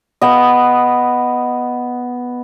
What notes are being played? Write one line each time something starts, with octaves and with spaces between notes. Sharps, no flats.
B3 D#5